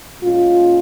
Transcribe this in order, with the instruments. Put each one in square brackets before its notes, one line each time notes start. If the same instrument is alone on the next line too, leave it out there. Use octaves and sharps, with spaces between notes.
[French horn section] A#2 G#3 C#4 F4